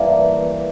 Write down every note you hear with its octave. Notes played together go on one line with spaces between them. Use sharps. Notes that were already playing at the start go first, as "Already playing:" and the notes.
Already playing: G2 E3 A#3